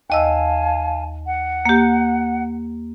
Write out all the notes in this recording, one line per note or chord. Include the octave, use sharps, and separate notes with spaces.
D#2 D#5 F5 G#5 A5 E6
F#5
A#3 G4